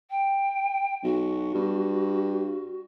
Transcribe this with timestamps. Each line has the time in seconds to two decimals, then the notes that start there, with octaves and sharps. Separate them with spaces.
0.10 G5
1.04 B1 F#4
1.55 G2